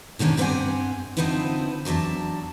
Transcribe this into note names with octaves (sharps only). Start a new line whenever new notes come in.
B2 D3 D#3 C#4 D4
G2 B3 C4 D5 F#5 G#5
D3 F3 B3 C4 D#4 E4
E2 F#3 D4 E5 A5